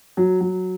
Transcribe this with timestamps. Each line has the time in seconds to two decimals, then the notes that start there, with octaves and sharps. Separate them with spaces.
0.17 F#3
0.41 F#3